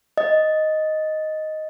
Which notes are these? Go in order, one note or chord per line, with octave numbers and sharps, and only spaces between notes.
D#5